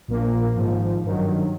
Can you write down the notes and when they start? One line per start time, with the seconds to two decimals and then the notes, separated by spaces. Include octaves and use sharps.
0.08 A#1 A#2 F3 A#3
0.56 G#1 G#2 F3
1.03 G2 D#3 F#3